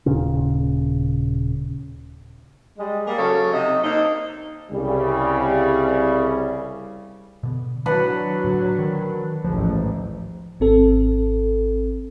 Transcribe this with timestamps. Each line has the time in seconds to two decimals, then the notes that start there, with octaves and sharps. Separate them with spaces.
0.06 D#1 A#2 C#3 C#4
2.78 G3 G#3
3.06 G3 A#3 G#4
3.18 C#3 F#3 A4 C#5 F5
3.53 C3 D#4 D#5
3.83 A#3 C4 D4 D#4
4.71 C2 C#3 G3
7.43 B2 D3 B3
7.86 D#3 F#3 D4 B4 F#5
8.44 A2 D3
8.79 D#3
9.44 A1 D2 G#2 F3 F#3
10.60 G#1 C4 A4